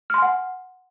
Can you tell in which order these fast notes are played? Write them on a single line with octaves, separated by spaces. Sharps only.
F6 C6 G#5 F#5